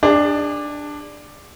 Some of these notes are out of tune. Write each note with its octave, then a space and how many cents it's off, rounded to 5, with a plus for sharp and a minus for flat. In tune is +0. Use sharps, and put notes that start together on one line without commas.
D4 +5 G#4 -40